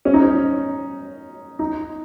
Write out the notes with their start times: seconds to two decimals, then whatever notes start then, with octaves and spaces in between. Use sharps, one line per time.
0.05 C#4
0.14 D#4
0.23 C#4
1.59 D#4